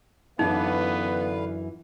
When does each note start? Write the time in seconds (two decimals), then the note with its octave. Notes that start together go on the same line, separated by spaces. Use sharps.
0.39 F#2 D3 E3 B3 D4 D#4 B4 F5